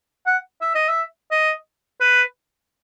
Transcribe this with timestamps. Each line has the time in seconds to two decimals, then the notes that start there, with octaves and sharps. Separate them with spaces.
0.26 F#5
0.61 E5
0.75 D#5
0.89 E5
1.31 D#5
2.00 B4